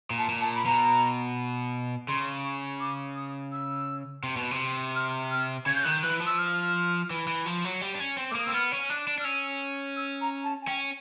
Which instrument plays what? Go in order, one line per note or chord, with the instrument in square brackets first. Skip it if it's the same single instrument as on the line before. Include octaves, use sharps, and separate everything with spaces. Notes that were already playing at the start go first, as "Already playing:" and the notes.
[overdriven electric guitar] A#2
[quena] A5
[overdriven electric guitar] A#2
[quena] A5
B5
[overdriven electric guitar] B2 [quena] A#5
[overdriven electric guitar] C#3 [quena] C6
[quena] C#6
D6
D#6
E6
[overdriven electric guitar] C3
B2
C3
[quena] F6
F6
[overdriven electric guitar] C#3 [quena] G#6
[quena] G6
[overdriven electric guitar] D#3 [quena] F#6
[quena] G6
[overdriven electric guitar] E3 [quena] F#6
[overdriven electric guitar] F3
[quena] E6
F6
[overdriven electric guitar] E3
E3
F3
F#3
G3
D4
C#4
C4
[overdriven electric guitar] A3 [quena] D6
[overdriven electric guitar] A#3 [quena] D#6
[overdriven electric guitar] C4 [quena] E6
[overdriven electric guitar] B3 [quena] F6
[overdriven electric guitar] C#4
[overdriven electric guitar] D4 [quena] F#6
[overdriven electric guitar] D4
[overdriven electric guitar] D4 [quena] F6
[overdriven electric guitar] C#4 [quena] E6
[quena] E6
A#5
A5
G#5
[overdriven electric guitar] C#4 [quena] G5